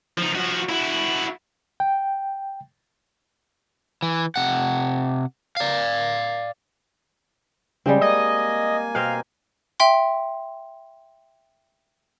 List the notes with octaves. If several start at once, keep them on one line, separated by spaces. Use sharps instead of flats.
F3 D#4
F3 F#4
E4 F#4
G5
E3
C3 F#5
D5 F5
C#3 G3 G#3 C4
A#3 D#5 G#5
B2 C4 A#4 F5
E5 G5 C6